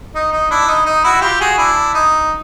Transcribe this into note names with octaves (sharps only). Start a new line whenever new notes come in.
D#4
D#4
D4 E4
D#4
D#4
E4 F#4
F4 G4
F#4 G#4
D4 E4
D#4